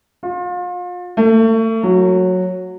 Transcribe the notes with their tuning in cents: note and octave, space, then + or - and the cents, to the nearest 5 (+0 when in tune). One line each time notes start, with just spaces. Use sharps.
F4 +35
A3 +35
F#3 -10